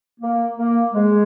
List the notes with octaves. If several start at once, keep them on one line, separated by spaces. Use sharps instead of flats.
A#3
A#3
G#3